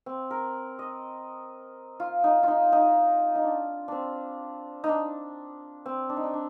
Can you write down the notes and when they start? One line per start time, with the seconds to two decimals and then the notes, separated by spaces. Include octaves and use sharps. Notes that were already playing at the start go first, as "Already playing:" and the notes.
0.06 C4
0.31 A#4
0.79 D#5
2.00 F4
2.24 D#4
2.43 D#4 F4
2.73 D#4
3.35 D#4
3.44 D4
3.88 C4 D4
4.84 D#4
4.89 D4
5.86 C4
6.09 D4
6.17 D#4
6.24 D4
6.34 D4